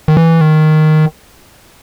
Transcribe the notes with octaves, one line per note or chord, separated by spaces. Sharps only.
D#3
E3
D#3